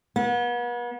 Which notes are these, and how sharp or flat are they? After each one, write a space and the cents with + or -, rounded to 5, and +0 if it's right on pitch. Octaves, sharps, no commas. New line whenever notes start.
B3 -40